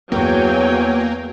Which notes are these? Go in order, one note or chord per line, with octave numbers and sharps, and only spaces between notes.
E2 F#3 A#3 G5 G#5